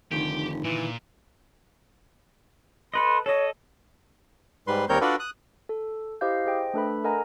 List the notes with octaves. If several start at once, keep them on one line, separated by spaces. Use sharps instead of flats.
F1 D3 D#3 G4
A#2 E3
A4 B4 D#5 C6
A4 C#5 D#5
G#2 G3 B4 C6
D#2 G3 C4 A#4 C#5 G6
D4 F4 F#4 A4 B4 D5
D#6 F#6
A4
E4 G4 C5 D#5 F5 G6
G#4 C5 D#5 G5
A3 D4 A4 B4 E5 B5
A4 A#4 D#5 F#5 G#5 A#5